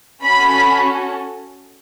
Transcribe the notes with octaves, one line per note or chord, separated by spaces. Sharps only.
C#4 F#4 A4 B5